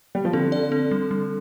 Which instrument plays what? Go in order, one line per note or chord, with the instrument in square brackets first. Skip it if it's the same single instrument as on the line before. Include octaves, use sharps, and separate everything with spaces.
[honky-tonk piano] G3
F3
[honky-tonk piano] D3 [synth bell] C4
[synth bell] D5
C4
G3
G3